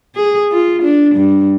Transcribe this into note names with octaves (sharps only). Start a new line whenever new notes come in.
G#4
F4
D4
G2